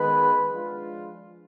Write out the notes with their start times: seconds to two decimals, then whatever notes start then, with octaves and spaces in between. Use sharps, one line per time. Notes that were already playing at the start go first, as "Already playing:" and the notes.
Already playing: D#3 G#3 B3 B4
0.50 F3 G#3 D4 F4